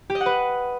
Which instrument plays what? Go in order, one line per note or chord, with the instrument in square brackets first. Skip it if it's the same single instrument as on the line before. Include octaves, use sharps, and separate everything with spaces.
[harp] G4
D#5
F#5
B4